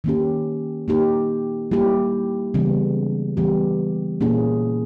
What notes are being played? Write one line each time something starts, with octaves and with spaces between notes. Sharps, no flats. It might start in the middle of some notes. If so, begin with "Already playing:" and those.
D#3 A#3 C#4 G4
A#3 D#4 G4
G3 A#3 E4 G4
C#3 E3 G3 B3
E3 G3 B3 G4
A#2 A#3 C#4 E4 G#4